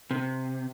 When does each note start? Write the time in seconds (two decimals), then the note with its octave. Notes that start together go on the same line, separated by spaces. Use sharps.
0.11 C3